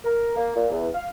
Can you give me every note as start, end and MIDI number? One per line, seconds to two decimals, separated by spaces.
0.04 0.32 70
0.36 0.55 58
0.55 0.67 46
0.70 0.87 40
0.94 1.08 77